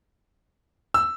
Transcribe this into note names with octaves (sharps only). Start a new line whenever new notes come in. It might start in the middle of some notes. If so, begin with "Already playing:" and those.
E6